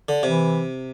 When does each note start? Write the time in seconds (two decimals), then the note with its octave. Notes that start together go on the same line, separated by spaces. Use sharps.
0.09 D3
0.23 C3 E3